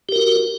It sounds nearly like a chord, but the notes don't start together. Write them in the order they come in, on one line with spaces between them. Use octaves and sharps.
G4 A#4 F#4